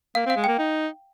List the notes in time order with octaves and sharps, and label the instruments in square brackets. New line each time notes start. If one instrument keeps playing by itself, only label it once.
[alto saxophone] A#3 [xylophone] F5
[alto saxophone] C4
[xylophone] F5
[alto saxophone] G#3
[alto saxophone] A#3 [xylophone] G5
[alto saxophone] D#4